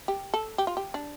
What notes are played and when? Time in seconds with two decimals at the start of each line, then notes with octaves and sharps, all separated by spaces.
0.08 G4
0.34 A4
0.58 G4
0.67 F4
0.77 G4
0.94 D4